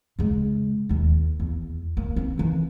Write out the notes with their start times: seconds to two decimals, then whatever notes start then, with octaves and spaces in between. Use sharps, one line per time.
0.19 C#3 G#3
0.89 D#2 D#4
1.40 E2
1.97 A#3
2.16 C4
2.38 D3 E3